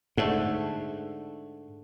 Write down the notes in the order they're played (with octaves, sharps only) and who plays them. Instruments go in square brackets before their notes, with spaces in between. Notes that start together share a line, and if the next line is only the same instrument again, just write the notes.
[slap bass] G#2 [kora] D3 A3